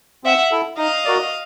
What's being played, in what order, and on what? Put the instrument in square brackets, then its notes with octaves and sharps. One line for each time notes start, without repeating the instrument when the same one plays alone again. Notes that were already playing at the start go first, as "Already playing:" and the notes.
[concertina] C4 [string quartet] E5 F#5
[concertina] E4 A4
[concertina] D#4 [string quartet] D#5 F5
[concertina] F#4 A#4 D5